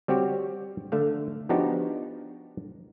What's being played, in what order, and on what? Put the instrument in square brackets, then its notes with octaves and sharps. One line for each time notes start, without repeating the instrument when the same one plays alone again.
[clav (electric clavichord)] G3 C4 F#4 G4 C#5
D3 A3 E5 F5
F3 B3 D4 D#4 F#4 G4